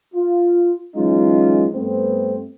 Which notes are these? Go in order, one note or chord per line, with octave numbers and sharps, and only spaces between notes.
F4
E3 F#3 G#3 C#4 D#4 F4
G2 A3 B3 C4